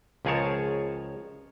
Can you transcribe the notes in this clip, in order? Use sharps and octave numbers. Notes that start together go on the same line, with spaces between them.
C#2 F3 G#4 A#4 C#5 A5